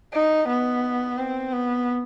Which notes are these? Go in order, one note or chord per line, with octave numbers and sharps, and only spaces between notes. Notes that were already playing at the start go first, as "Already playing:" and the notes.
D#4
B3
C4
B3